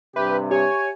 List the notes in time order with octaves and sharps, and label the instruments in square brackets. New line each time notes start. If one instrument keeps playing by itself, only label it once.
[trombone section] G2 C3 [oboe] G4 [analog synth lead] B4 [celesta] E5
[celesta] G4 E5 [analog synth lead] C#5 [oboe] G#5